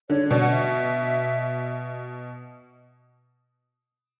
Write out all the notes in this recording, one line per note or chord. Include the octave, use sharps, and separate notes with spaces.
D3 C#5
B2 D5
F#5
E5